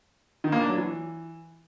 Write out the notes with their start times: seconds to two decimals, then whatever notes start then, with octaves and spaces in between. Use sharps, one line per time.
0.44 D#3
0.52 A#3
0.61 D4
0.69 F#3
0.77 E3